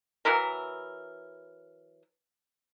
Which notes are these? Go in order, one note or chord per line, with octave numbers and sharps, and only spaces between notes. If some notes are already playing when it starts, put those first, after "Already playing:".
E3 F#3 E4 A#4